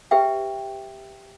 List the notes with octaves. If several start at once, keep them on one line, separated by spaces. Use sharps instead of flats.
G4 B4 E5 G5